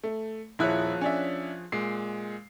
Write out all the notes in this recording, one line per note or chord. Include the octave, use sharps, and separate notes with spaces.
A3
D#1 F3 E4 G#4 C#5 F#6
C#4 D4 E5
A#2 G#3 C7